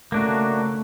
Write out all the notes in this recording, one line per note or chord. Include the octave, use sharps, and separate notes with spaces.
C#3 A3 A#3 D4 F#4